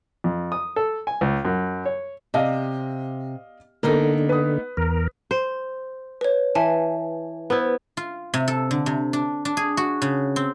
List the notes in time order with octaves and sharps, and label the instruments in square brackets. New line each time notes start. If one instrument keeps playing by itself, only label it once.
[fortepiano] F2
D#6
A4
G#5
C#2
F#2
C#5
[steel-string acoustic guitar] C3 [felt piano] D5 D#5 F5
[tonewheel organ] D3 [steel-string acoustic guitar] A#3 B3 D#4 [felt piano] A4 A#4
[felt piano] B4 D#6
[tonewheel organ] E2 A#4
[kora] C5
[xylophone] B4 C#5
[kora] E3 [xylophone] E5 G#5 A5
[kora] B3 E4 [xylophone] B4 C5
[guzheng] F4
C3
A4
D3
C3
D4
D4
G#4
F#4
C#3
C4